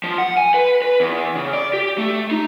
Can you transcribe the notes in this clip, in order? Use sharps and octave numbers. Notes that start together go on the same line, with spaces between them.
F3
F#5
G#5
B4
B4
E2
C#3
D5
G4
A3
D#4